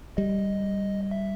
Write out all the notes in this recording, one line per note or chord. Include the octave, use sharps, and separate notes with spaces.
G3 D#5
E5